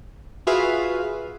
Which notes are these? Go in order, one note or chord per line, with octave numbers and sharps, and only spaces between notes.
F4 F#4 G#4 B4 E5 F5